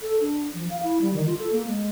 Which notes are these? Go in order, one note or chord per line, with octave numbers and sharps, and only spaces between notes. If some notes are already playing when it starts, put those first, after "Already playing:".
A4
D4
F3
F5
E4
G3
D#3
F4
A4
A#3
G#3